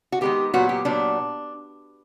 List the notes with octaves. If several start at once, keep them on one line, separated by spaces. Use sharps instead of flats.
F#4
D#3 G#3 B3 G4
A#2 F#3 B3 F#4
G4
A#2 F#3 B3 D4